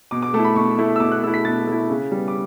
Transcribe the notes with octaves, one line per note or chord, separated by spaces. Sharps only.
B2 D6
D6
A3 E4 A5
B5
B2 C#6
A3 E4
E6
B2 D6
F#6
A3 E4 E6
B6
B2 A6
A3 E4
C#3
G3 B3
D6